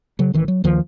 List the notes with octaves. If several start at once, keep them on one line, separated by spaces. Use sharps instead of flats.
C#3 F#3
A1 D#3 E3
F#3
D#2 D#3 F3